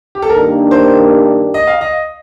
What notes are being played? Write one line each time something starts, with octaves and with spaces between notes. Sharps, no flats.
G4
A4
G2 D#3 A#3 D4 G4 A#4
C5
D#5
F5
D#5